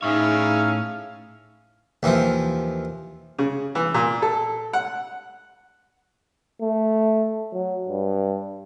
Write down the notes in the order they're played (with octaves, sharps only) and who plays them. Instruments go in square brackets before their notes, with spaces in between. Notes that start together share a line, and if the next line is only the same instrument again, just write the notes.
[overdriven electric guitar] A2 C#5 [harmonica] C#4 G#4 E5 [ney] D#4 [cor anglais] F5
[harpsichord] D#2 E3 F3
[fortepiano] C#3
E3
A#2
A4
F#5
[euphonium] A3
F#3
G2